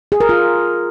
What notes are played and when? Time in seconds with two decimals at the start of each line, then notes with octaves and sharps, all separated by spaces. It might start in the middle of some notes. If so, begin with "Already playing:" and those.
0.12 G#4
0.20 A#4
0.29 F4